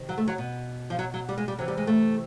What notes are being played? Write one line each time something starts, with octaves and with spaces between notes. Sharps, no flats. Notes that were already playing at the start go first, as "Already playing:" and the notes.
Already playing: C3 D#3
F#3
A3
F#3
B2
F3
F#3
F#3
G3
G#3
G3
C3 E3 F#3
G3
G#3
A3